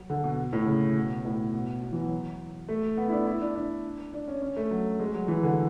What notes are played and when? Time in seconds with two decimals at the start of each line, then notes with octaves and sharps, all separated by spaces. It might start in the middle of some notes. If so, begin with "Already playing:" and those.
Already playing: F#3
0.10 D3
0.24 B2
0.53 A2
0.67 C#3
0.96 B2
1.25 A2
1.54 B2
1.83 B2
1.92 E3
2.01 F#3
2.69 A3
2.97 B3
3.08 E4
3.12 D4
3.27 E4
3.41 D4
3.55 D4
4.13 D4
4.28 C#4
4.42 C#4
4.57 A3
4.71 F#3
5.00 G#3
5.14 F#3
5.28 E3
5.43 D3